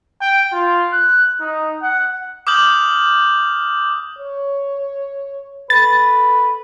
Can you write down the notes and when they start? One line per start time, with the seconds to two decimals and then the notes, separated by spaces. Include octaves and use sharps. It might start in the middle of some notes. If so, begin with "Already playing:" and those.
0.21 G5
0.52 F4
0.92 F#6
1.41 D#4
1.82 F#5
2.47 D6 D#6 F6 G6 F#7
4.18 C#5
5.70 A4 B4 A6